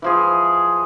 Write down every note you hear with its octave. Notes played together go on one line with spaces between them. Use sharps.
E3 F3 G#4